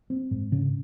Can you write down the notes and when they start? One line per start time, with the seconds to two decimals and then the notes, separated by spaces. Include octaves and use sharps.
0.10 C4
0.31 G#2
0.52 C#3